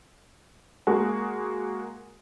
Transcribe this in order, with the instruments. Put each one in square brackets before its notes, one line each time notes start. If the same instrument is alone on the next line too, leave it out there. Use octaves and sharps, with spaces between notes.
[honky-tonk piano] G#3 A#3 F#4 G#4